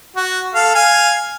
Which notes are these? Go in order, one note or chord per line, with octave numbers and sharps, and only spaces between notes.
F#4
A4 F5
F5 G#5